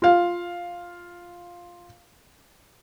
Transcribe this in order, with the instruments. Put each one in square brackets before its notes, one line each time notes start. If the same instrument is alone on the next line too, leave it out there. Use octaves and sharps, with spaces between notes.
[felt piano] F4 F5